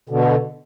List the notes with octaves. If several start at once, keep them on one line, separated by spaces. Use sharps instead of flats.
B2 D3